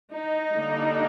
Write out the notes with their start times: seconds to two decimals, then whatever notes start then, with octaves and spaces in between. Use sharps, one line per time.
0.14 D#4
0.55 D3 G3 A#3 D4